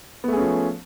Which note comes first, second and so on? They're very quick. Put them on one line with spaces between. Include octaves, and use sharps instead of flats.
B3 A3 G#4 C#4 F3